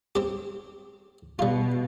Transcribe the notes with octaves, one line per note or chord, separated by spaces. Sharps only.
C4 G4
B2 G3 F4